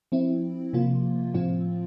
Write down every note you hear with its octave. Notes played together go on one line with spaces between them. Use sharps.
F3 C4 E4
C3 F3 A#3 F4
A2 F3 C4 F4